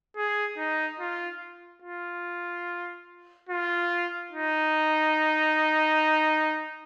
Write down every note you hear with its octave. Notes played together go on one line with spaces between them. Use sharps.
G#4
D#4
F4
F4
F4
D#4